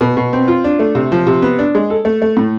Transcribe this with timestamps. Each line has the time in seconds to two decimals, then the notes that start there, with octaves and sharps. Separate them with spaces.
0.01 B2
0.17 B2
0.33 C4
0.48 F4
0.64 D4
0.79 A3
0.95 C3
1.12 F3
1.27 C3
1.42 B3
1.59 D4
1.75 G#3
1.90 A4
2.05 A3
2.22 A3
2.37 A2